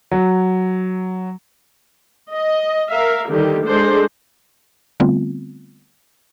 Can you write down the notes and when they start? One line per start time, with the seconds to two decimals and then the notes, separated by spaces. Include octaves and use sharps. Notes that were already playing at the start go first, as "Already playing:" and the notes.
0.11 F#3
2.32 D#5
2.89 A#4 E5 F5
3.27 D3 D#3 G3 G4
3.65 G#3 D4 A4 C5
5.00 D3 G3 A3 B3 C4 F4